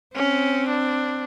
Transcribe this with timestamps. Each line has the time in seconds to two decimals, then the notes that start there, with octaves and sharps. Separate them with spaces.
0.16 C4 C#4
0.68 D4